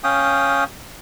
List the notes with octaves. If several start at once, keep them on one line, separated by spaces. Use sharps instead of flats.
C#4 F5 G5 D#6